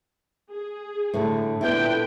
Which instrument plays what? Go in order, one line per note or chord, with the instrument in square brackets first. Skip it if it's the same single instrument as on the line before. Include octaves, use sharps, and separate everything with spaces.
[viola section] G#4
[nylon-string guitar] A2 D3
[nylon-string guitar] A#2 B3 E4 [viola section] D3 B4 G5